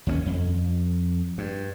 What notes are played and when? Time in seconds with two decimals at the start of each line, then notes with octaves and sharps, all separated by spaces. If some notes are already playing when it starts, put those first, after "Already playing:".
0.07 D#2 G#3 C#4
0.26 F2
1.38 G2